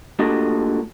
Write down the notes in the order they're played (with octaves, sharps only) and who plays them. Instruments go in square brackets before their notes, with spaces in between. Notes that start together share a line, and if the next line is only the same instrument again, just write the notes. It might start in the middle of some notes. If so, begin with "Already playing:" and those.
[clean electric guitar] A#2 A3 D4 F#4 G4 D#5